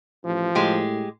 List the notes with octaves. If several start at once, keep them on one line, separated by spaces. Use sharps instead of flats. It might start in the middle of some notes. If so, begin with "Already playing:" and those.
A1 F3
A2 G#3 G4